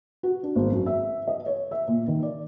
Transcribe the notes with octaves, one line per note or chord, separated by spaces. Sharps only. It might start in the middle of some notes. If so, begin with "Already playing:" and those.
F#4
D4
G#1
F#2
E5
D#5
C#5
E5
A#2
D#3
D5